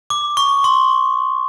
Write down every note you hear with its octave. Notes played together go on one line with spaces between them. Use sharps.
D6
C#6
C6